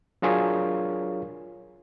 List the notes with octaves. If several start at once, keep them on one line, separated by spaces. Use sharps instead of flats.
F#3 D4 F4 G#4 A#4 C#5